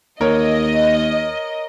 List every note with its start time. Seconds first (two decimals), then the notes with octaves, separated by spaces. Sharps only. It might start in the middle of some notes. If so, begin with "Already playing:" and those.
0.21 D#2 A#4 C#5 D#5